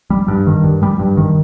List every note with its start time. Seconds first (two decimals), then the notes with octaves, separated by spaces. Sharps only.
0.10 G3
0.28 G2
0.47 D#3
0.64 G2
0.83 G3
0.99 G2
1.17 D#3